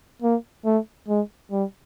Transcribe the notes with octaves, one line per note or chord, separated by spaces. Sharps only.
A#3
A3
G#3
G3